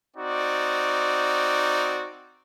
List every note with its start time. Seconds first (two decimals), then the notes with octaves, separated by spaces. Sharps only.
0.17 C4 D#4 F#4 D5